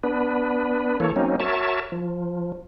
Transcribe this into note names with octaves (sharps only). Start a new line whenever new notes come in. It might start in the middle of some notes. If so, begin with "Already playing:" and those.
B3 D4 B4
E3 A#3 A4 C#5
F#3 A#3 C4 C#4 D#4
F#4 A#4 C#5 E5 A5
F3